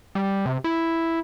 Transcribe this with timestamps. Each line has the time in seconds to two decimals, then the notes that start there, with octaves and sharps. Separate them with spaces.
0.15 G3
0.46 C3
0.64 E4